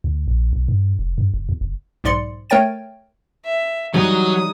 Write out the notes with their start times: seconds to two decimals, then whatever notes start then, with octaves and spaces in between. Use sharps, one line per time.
0.04 D2
0.28 A#1
0.53 B1
0.68 G2
0.99 F1
1.18 G2
1.34 F#1
1.49 E2
1.61 F#1
2.04 B1 G#2 D5 C6 C#7
2.50 A3 A#4 C#5 G5 A6 D#7
3.45 E5
3.94 E3 F#3 G3 D4 D#4 G#4 D#6